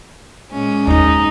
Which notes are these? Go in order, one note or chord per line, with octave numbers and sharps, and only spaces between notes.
A#2 G#3 C#4
D#2 D#4 F4